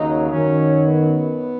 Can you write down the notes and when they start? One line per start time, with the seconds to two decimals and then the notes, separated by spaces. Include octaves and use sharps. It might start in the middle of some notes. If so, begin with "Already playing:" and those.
Already playing: D#2 C#3 F#3 D#4
0.31 F#2 D#3 F#3 C#4
0.84 B3